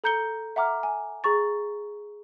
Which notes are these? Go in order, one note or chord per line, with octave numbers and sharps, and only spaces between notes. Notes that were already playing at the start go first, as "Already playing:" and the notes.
A4 A#5 G6 C#7 G7
E5 F#5 A#5 D6 F6
G#5
G#4 A#5 C#6 A6